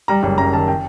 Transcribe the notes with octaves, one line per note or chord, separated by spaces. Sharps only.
G3 A#5
F#1
F#2 A#5
D#3 A5
G5